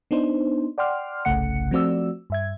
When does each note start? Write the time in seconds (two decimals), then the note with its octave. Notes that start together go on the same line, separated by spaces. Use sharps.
0.11 B3 D4 D#4 C5
0.78 D5 F#5 G5 C6 D6 F6
1.25 G1 C2 C#3 A3 F#5 C#7
1.71 F3 A3 C4 F#4 D5 E6
2.30 G2 E5 G#6